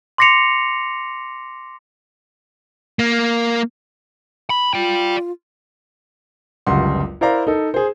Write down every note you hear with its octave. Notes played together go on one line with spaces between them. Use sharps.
C6 D6 A#6 C7 C#7 F7
A#3
B5
F4 D5 G5
G1 C#2 F#2 G3 F#5 C6
E4 A#4 C5 D5 F5 A#5
D#4 A4
G#4 C5